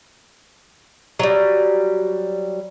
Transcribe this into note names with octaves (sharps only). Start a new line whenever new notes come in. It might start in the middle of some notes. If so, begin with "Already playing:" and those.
F#3 G3